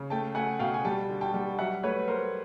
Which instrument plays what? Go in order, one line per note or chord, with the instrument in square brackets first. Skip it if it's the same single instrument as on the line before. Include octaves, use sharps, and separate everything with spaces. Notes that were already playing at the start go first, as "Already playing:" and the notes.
Already playing: [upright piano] C#3
A3 G5 A5
A3 F#5 G#5
B2 F5 G5
G#5
G3 G5 A5
D3
G5 A5
G3
F#3 E5 F#5
A3 B4 C#5
A3 A#4 C5